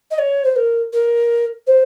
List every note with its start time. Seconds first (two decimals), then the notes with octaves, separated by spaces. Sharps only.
0.10 D#5
0.18 C#5
0.44 C5
0.56 A#4
0.92 A#4
1.66 C5